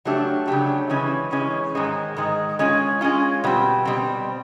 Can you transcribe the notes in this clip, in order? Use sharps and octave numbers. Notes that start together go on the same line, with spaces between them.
C#3 F#3 A3 D4 G4
C#3 F#3 A3 D4 G4
C#3 E3 G#3 C#4
C#3 E3 G#3 C#4
G#2 D#3 G#3
G#2 D#3 G#3
G#3 C#4 F4
G#3 C#4 F4
B2 G3 C4
B2 G3 C4